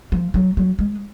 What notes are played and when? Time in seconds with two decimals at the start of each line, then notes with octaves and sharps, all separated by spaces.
0.12 F3
0.34 F#3
0.57 F#3
0.79 G#3